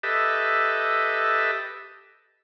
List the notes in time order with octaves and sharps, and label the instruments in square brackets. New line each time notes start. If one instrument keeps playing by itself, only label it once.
[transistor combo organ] G4 A4 B4 D#5 E5